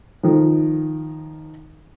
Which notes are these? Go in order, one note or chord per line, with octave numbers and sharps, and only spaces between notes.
D#3 F3